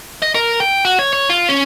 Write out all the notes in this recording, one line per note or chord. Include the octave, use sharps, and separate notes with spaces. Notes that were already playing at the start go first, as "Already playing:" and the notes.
D#5
A#4
G5
F#4
C#5
C#5
F4
C#4